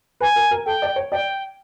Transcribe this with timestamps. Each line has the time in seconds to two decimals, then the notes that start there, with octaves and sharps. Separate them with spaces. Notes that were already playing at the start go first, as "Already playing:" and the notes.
0.21 B4 G#5
0.36 A#4
0.51 A#4
0.66 A4 G5
0.82 D5
0.96 C#5
1.12 D5 G5